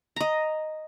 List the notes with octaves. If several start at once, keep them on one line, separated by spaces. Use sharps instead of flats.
D#5 A#5